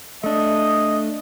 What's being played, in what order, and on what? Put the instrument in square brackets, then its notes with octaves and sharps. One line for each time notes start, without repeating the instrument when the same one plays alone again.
[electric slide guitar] A3 D4 [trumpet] D#5